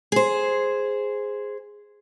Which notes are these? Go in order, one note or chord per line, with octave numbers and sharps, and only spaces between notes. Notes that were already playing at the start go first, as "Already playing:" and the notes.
G#4 C5